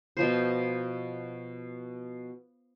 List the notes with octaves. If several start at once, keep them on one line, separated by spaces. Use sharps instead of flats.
B2 F3 C5